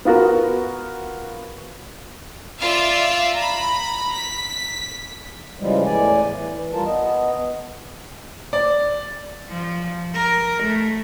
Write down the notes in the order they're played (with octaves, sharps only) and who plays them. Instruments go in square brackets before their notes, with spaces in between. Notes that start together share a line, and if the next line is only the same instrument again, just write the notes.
[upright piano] B3 F4 F#4 A#4
[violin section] F4 D5 E5 F5
A#5 B5
B6
[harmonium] C#3 E3 F3 G3 G#3
E2 A2 D5 G#5
E3
G3 F4 A#4 A5
B3 D#5
[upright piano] D5
[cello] F3
A#4
A3